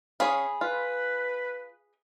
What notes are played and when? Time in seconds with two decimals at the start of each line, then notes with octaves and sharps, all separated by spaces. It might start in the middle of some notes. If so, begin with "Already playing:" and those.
0.20 C#4 G#4 C#5 F5 B5 D#6
0.61 F4 B4